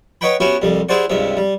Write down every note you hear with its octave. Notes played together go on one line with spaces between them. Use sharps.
B4 C#5 D#5 F#5 G5 B5
B3 C#4 E4 F#4 G4
C2 F2 G3
E4 G4 G#4 C5 D5 F#5
C#2 G2 C3 E5
G3